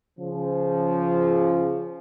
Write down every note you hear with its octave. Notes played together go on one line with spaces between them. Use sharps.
C#3 F3